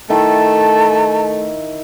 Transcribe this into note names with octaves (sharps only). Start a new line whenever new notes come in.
D#3 A3 E4 A5 D6